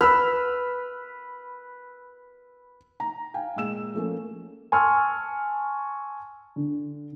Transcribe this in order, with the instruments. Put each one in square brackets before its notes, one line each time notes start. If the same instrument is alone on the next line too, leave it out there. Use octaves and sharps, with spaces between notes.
[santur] B4 [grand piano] B5 E6 F6
[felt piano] A#5
F5 G5 G#5
A#2 G#3 E6 E7
F3 A3 A#3 C#4
[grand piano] G#5 A5 C6 C#6 E6 F6
D3